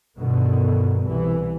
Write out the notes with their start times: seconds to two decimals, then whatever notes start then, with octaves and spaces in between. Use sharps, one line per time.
0.18 G1 B2 D3 D#3 B3
1.04 C2 E3